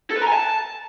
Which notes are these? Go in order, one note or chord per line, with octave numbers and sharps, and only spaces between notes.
A4
B4
A#5
G#5
A5